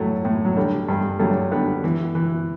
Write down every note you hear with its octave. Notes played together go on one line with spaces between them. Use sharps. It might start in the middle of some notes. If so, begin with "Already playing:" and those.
Already playing: A2 F#3 A3
A2
F#3
D3 G3
G2
G2 F#3 A3
D3 G3 B3
E3
E3